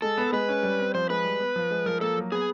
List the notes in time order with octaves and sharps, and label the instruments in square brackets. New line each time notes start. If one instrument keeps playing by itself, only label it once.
[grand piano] G#3 [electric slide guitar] A4
[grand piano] B3
[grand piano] G#3 [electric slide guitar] B4
[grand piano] C#4
G3
C4
[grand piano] F3 [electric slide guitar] C5
[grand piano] G#3 [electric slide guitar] B4
[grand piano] G3
B3
F3
G#3
[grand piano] F3 [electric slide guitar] A#4
[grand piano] A#3 [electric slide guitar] A4
[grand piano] F#3
[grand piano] B3 [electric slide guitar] G#4